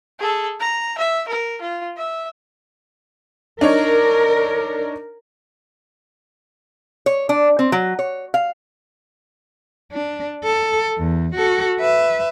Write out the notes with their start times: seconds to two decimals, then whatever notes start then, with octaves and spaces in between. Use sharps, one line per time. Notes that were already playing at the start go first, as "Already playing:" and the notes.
0.20 G#4 A4
0.60 A#5
0.98 E5
1.28 A#4
1.61 F4
1.96 E5
3.61 D4 D#4 A#4 C#5
7.06 C#5
7.29 D4
7.59 C4
7.72 F#3
7.99 C#5
8.34 F5
9.92 D4
10.44 A4
10.98 E2
11.35 F#4 A4
11.80 B4 E5